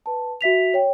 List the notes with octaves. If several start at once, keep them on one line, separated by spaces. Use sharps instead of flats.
B4 A5
F#4 E5 B6 F7
C#5 G5